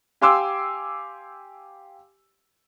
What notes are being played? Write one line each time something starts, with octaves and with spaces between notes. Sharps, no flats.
G4 F5 G#5 C6 D6 E6